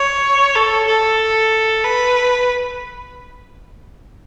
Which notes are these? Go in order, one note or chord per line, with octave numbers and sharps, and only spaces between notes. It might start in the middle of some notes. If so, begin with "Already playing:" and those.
Already playing: C#5
A4
A4
B4